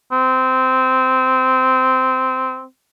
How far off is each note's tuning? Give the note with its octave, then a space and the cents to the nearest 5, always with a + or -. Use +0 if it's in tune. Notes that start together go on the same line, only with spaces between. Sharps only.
C4 -15